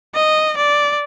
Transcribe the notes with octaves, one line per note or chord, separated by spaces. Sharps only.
D#5
D5